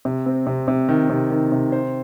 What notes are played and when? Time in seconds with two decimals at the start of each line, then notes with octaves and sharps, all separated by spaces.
0.05 C3
0.26 C4
0.47 C3
0.68 C3
0.89 D#3
1.10 C3
1.31 D#3
1.52 C3
1.72 C5